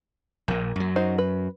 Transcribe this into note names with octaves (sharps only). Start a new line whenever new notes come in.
A#1 A#2 A#3
F#2 F#3
D#4 F#4 C5
B4